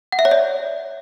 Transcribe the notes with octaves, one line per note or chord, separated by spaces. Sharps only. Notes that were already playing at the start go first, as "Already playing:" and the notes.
F#5
E5
C#5
D5